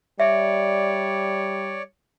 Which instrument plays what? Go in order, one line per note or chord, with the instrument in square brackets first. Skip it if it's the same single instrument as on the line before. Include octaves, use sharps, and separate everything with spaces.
[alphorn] G3 [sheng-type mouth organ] C#5 D5 [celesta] E5